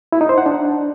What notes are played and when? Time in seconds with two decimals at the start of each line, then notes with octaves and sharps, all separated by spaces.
0.12 E4
0.21 D#4
0.29 C5
0.38 F#5
0.46 D4